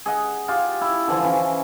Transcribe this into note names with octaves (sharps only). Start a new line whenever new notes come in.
G#4 D#5 F#5
F4 G4 G#5
E4
D3 E3 F3
E3 C#4